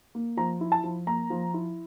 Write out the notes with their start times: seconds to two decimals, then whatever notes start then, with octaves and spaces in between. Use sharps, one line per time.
0.15 A#3
0.37 F3 A#5
0.61 E4
0.72 A5
0.84 F3
1.07 A#3 A#5
1.30 F3
1.54 E4